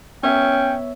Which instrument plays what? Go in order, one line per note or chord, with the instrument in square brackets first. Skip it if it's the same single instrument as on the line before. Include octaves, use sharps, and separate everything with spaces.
[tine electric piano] B3 C#5 E5 [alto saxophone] C#4 [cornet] G5